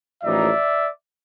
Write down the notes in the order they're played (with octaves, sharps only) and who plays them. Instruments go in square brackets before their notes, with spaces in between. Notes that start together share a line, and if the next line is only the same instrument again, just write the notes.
[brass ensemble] A1 A2 F3 A#3 D#4 D5 E5